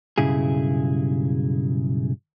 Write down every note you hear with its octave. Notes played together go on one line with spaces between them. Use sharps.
B1 G2 C#3 E4 G#4